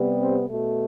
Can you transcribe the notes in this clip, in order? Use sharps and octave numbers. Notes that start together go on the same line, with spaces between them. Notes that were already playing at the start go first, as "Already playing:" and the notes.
Already playing: C3 G3 B3
C4
B2 A3